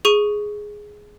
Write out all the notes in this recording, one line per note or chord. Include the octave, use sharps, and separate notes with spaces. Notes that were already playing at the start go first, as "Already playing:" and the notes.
G#4 C#6 D#7